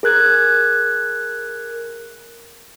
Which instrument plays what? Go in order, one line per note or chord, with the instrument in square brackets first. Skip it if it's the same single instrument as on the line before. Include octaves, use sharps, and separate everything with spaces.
[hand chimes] G#4 A#4 F#6 G#6